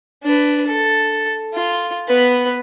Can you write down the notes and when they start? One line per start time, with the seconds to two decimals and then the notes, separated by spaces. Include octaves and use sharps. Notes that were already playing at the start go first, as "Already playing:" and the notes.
0.23 D4 B4
0.67 A4
1.53 F4
2.08 B3 B4